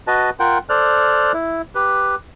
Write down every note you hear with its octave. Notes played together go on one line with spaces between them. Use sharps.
F#4 B4 D#5 A5
F4 A#4 F#5 G5
A4 C5 D5 F6 F#6
E4
G4 B4